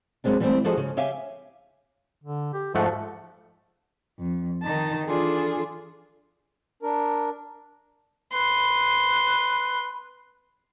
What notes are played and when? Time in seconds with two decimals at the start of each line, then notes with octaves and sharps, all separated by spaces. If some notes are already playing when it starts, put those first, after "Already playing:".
0.24 F#2 C3 F#3 G#3 C4 D4
0.40 E3 G3 A3 A#3 C4
0.64 F3 F#4 G#4 A4 C5 D#5
0.77 C#3
0.97 G4 C#5 E5 F5 G#5
2.24 D3
2.53 G4
2.75 G#2 F3 A3 A4 F#5
4.18 F2
4.64 D#3 D#4 A5
5.07 E3 D4 F4 G#4 A4
6.83 D4 A#4
8.33 B4 C6